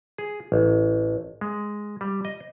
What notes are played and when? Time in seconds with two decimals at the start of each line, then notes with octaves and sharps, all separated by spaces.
0.18 G#4
0.52 A1
1.41 G#3
2.01 G3
2.25 D#5